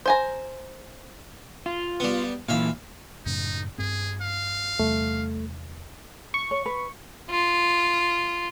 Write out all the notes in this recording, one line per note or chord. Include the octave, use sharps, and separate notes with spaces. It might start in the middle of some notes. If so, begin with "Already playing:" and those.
C5 G#5 A#5
F4
G3 B3
A#2 D#3 E3 E5 F5
F#2 A2 C#3 D#4
G2 C4 G#4
F5
E2 C3 G3 A3
C#6
C#5
B4
F4